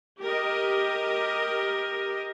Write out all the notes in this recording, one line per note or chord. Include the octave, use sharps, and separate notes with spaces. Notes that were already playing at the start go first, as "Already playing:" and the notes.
G4 A#4 D#5